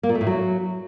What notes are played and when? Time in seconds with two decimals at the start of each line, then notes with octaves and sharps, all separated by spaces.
0.03 A#3
0.09 A#2
0.15 A3
0.21 A2
0.27 F#3